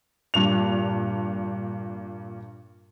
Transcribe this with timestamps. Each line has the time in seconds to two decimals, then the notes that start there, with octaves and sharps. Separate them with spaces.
0.34 G2 A#2 F7